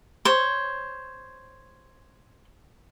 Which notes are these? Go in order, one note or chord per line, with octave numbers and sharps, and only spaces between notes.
C5 C#5